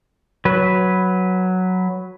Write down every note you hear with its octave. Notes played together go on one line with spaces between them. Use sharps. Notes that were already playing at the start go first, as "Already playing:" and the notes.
F#3 B4